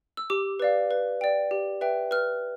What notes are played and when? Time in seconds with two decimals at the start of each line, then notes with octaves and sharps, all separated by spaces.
0.17 E6
0.30 G4 D6
0.60 B4 D5 F5
0.91 B4
1.21 D5 G5
1.51 G4
1.81 B4 E5 G5
2.11 B4 F6